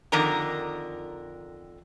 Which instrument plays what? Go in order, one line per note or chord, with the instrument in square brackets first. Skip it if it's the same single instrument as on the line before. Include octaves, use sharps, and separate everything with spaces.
[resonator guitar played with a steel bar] F2 D3 D#3 A#4 A#5